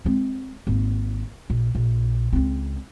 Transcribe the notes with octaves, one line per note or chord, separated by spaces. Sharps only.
G#3 C4
G#1 A#3
A#1
A#1
C#2 C4